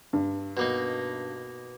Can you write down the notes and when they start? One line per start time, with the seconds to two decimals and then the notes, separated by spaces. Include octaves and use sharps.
0.13 G2
0.57 B2 A#3 D#4